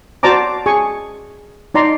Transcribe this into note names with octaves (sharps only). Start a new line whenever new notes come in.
F#4 C5 D5 A5 A#5 D6
G#4 G#5 C#6
D#4 D5 A#5 C6